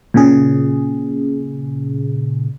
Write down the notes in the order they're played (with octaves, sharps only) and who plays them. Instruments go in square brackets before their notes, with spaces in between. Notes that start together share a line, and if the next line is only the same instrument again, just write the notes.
[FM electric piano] A#2 C#3 G#4